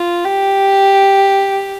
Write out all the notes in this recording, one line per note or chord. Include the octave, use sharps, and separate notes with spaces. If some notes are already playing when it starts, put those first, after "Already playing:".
Already playing: F4
G4